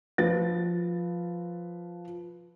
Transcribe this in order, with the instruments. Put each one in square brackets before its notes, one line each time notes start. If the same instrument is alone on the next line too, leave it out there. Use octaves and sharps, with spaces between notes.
[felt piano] F3 B4 A6